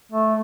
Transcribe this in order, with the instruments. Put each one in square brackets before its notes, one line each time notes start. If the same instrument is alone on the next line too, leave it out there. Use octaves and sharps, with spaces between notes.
[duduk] A3